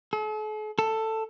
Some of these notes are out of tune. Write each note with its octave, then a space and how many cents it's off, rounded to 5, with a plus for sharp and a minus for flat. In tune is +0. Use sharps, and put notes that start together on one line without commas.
A4 -45
A4 +10